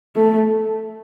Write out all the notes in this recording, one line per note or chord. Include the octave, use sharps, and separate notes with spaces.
A3